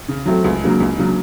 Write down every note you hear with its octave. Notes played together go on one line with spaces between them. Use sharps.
C#3
F#3 A3 C4
C#2
C#3 F#3 A#3 D4
C#2
C#3 F#3 A#3 D4